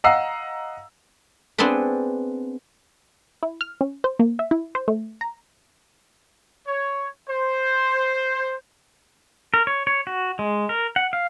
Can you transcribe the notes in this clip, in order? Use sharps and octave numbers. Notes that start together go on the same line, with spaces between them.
D#5 F5 F#5 A#5 E6 C7
B3 C4 D4 G#4 B4
E4
F6
C#4
C5
A#3
E5
E4
C5
A3
A#5
C#5
C5
A#4
C#5
C#5
F#4
G#3
A#4
F#5
F5